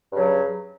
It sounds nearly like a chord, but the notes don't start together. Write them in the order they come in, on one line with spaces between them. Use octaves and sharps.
G2 C#3 F#3